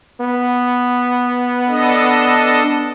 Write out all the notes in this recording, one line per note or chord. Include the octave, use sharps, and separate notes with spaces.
B3
D4 A4 D#5